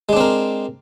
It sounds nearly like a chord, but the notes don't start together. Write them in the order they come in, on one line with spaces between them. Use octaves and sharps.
G#3 D4 C4 A#4